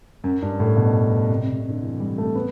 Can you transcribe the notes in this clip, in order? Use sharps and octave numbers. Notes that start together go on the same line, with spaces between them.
F#2
G2
A2
B2
C3
C3
C3
D3
E3
G3
A3
B3